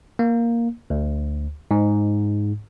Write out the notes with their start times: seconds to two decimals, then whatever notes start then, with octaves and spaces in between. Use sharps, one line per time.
0.19 A#3
0.90 D2
1.71 G#2